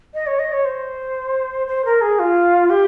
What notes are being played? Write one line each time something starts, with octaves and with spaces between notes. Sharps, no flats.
D#5
C#5
D#5
C#5
C5
C5
A#4
G#4
F4
G4